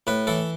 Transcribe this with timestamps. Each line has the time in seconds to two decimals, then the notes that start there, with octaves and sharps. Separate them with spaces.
0.07 A2 B4
0.27 E3 A4